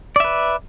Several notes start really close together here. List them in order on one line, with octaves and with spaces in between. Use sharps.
D5 E5 B4